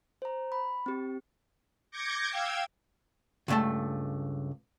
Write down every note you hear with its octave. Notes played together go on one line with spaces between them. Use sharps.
C5 A#5
B5
C4 G4
D6 G6 G#6 A#6 C#7
F5 G5 E6 G#6
C#2 G2 C3 A3 A5